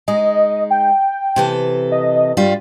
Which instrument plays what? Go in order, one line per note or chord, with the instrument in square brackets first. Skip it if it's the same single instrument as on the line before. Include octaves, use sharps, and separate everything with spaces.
[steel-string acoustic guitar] G#3 D#4 [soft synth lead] D#5
[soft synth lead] G5
[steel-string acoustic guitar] C3 E3 A4
[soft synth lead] D#5
[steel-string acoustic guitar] G2 G3 F4